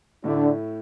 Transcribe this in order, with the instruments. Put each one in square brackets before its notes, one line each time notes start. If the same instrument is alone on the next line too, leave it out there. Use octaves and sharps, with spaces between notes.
[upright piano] A2 A3 E4 [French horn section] D3 D4